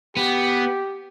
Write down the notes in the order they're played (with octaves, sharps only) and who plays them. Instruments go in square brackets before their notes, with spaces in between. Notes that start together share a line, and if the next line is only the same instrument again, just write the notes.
[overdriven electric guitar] B3 [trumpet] G4